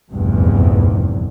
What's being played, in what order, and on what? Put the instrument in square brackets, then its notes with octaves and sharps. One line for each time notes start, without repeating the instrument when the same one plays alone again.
[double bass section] F1 A#1 E2 G2